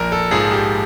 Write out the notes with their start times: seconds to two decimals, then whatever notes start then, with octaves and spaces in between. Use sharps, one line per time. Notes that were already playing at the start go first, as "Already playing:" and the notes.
Already playing: A#1 A#4
0.12 A4
0.31 G#2 F3 G#4
0.52 G4